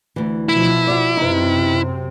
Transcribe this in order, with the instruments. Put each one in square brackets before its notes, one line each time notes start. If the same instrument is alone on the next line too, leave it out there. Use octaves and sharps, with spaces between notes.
[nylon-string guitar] D2 E3
[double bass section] B2 F3 [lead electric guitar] E4
[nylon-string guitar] F#4 D5
[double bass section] F#2 C3 C4 [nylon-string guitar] D#4 B4